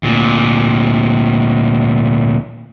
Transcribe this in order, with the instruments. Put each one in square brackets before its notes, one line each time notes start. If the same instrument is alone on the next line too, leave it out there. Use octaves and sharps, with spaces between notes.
[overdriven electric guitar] D2 A#2